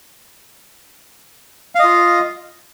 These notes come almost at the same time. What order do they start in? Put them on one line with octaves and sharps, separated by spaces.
F5 D#5 F4